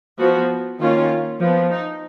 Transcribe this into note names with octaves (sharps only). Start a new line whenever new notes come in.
F3 B3 F#4
D#3 A#3 C#4 F4
F3 B3
D#4